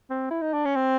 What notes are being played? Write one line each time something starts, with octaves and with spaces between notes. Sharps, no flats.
C4
E4
D#4
D4
C#4
C4